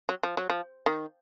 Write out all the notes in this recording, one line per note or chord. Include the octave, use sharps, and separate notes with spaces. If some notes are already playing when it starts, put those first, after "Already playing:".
F#3
F3
F#3
F3
D#3